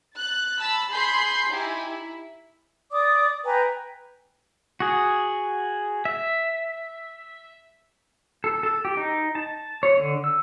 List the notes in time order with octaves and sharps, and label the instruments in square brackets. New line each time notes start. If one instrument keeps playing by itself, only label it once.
[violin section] F#6 A6
A5 B5 E6
G#4 B5 C6 G6
D#4 E4 G4 G#5
E4
[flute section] D5 D6 D#6
B4 G5 G#5 A#5
[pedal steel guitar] F#4 G#4
E5
A4
A4
G4
D#4
A5
C#5
D3
E6